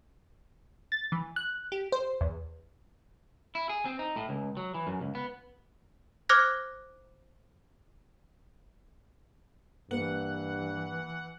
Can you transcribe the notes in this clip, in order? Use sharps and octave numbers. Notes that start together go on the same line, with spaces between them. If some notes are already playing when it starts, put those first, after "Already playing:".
A6
E3
F#6
G4
C5
E2
E4
G#4
C4
D#4
A2
C#2
F#3
E3
F#2
C#2
B3
C5 D6 F6 F#6 G#6 A#6
G2 E3 A#3 B4 F#5